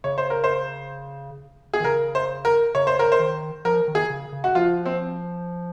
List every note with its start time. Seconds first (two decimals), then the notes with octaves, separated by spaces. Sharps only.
0.04 C#3 C#5
0.18 C5
0.30 A#4
0.44 C5
1.74 G#4
1.80 D#3
1.84 C#3 A#4
2.15 C5
2.45 A#4
2.75 C#3 C#5
2.87 C5
2.99 A#4
3.12 C5
3.20 D#3
3.65 F3 A#4
3.88 D#3
3.95 G#4
4.10 C#3
4.33 C#3
4.44 F#4
4.55 F3 F4
4.86 C4